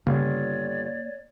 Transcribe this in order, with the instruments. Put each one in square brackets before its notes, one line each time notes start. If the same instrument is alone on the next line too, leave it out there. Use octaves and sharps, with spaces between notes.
[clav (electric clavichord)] G1 [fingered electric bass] C#3 [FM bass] A#3 [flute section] C#5 D5